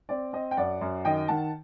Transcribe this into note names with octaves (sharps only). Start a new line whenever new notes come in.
C4 D5
C4 D#5
G5
F#2 D5 F#5
F#2
D#3 D#5 G5
D#3 F#5 A5